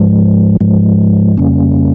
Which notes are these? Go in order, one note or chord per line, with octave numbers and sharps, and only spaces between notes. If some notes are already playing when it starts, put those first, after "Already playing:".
Already playing: G#2 F3 G#3
G#2 F3 G#3
F2 C#3 G3 A#3 C#4